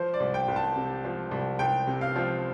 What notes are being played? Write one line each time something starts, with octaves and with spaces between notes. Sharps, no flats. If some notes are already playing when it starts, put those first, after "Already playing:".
Already playing: F3 C5
D5
C2
G5
C2
A5
C3
F3
C2
C2 G5
C3
F5
F3